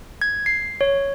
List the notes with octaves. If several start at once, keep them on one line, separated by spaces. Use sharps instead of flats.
G#6
C7
C#5